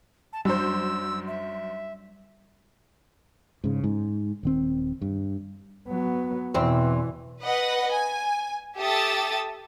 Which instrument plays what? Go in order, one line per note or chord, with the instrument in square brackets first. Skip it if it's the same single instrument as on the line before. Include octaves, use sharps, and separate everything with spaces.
[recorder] A5
[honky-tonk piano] F#2 C5 [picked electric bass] G3 D4 [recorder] E6
[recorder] E5
[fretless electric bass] G#2 C#3
G#2
D#1 D#3 C4
G2
[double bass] F#3 B3
[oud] E2 C4 [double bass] B2 E3
[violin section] B4 D#5 F#5
G#5
G4 A4 E5 D#6 E6 A6